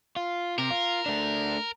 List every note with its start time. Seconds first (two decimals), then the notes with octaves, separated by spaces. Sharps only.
0.16 F4
0.58 C3 A#4
0.71 F4
1.06 A3 D4